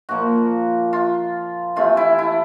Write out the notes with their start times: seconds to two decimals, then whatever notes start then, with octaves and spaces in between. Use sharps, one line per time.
0.09 A#2 F3 A#3 F#4
0.93 F4
1.76 C3 E3 A3 F4
1.97 E4
2.19 E4